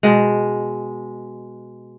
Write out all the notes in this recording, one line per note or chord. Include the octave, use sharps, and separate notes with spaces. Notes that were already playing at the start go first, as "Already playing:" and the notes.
B2 G#3